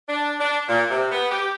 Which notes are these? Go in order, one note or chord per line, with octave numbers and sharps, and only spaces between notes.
D4
D4
A#2
C3
B3
G4